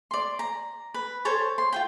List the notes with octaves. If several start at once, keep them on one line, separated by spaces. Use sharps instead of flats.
D5 C6
A#5
B4
A4 C5 C#5 A5
C6
F4 G#4 G5